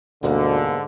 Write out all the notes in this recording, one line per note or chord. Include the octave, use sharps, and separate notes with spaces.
D2 G#2 B2 D3 G3 A#3